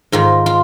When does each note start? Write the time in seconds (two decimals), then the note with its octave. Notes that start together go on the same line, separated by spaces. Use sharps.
0.12 G#2 D#3 F4
0.46 F4